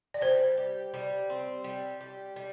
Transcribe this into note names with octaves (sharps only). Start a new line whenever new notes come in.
D5
G3 C5
G4
G3
C4
G3
G4
G3